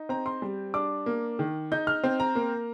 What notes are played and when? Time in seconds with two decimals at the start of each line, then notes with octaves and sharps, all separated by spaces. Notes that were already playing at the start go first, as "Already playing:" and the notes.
Already playing: D#4
0.09 C4 A#5
0.26 C6
0.42 G3
0.74 D4 D6
1.06 A#3
1.39 D#3
1.72 D#4 G6
1.87 F6
2.04 C4
2.20 A#5
2.35 A#3